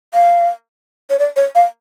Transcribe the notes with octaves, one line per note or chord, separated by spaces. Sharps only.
F5
C#5
D5
C#5
F5